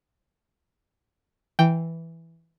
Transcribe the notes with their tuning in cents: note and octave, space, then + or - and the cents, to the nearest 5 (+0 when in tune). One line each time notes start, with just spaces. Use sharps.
E3 +0 G5 +0